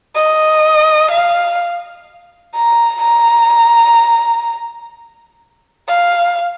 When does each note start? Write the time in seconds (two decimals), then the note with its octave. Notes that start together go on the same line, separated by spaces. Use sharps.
0.16 D#5
1.12 F5
2.55 A#5
3.02 A#5
5.89 F5